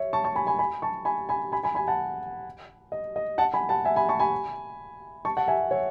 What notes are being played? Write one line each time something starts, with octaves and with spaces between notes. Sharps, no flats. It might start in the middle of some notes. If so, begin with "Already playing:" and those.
Already playing: C#5 E5
A5 C#6
A5 C#6
G#5 B5
G#5 B5
G#5 B5
A5 C#6
G#5 B5
G#5 B5
G#5 B5
G#5 B5
G#5 B5
F#5 A5
D#5
D#5
F#5 A5
G#5 B5
F#5 A5
E5 G#5
G#5 B5
A5 C#6
G#5 B5
A5 C#6
F#5 A5
E5 G#5
C#5 E5